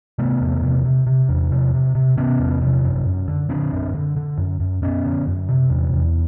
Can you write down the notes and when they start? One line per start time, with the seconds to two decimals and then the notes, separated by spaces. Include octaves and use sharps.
0.19 C3 A3 B3
0.41 E2
0.63 C3
0.85 C3
1.07 C3
1.29 E2
1.52 C3
1.74 C3
1.95 C3
2.17 C3 B3 C#4
2.39 E2
2.62 C3
2.84 F#2
3.05 F#2
3.28 D3
3.49 D3 C4 D4
3.73 F#2
3.94 D3
4.17 D3
4.38 F#2
4.60 F#2
4.82 F#2 B3 C#4
5.05 D3
5.27 F#2
5.49 C3
5.70 E2
5.93 E2